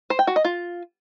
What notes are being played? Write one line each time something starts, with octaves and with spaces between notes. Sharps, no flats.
C5
G5
F#4
D#5
F4